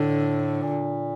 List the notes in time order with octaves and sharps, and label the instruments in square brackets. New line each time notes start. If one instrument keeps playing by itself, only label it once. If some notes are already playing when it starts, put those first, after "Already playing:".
Already playing: [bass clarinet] A2 [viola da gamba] D3
[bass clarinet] A#2